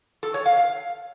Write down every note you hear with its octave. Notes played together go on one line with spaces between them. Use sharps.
A4
C#5
F5
F5